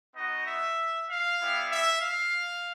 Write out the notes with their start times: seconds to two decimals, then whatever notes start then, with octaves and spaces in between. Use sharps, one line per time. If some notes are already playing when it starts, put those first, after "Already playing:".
0.15 B3 D#4 F#4 D#5
0.47 E5
1.08 F5
1.40 G3 B3 E4
1.71 E5
2.01 F5